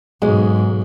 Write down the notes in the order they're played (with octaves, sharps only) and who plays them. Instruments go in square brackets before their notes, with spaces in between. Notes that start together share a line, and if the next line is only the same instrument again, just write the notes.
[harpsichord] B1 [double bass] G#2 [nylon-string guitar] G#3